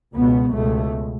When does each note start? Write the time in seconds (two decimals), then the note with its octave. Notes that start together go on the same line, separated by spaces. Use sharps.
0.14 C#2 B2 B3
0.54 C#2 B2 A3